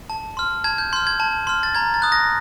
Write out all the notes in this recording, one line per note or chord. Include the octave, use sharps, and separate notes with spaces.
A5
C6 F6
A5 G#6
G6
C6 F6 G6
G#6
A5
C6 F6
A6
A#5 G#6
A6
D#6 F#6
A#6